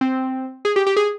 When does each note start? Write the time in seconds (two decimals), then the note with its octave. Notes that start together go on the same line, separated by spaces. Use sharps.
0.01 C4
0.65 G#4
0.76 G4
0.87 G4
0.97 G#4